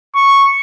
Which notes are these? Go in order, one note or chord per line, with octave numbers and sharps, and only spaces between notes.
C#6